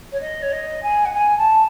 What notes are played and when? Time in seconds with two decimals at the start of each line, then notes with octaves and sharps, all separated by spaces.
0.12 C#5
0.20 D#5
0.42 C#5
0.52 D#5
0.82 G#5
1.05 F#5
1.13 G#5
1.37 A5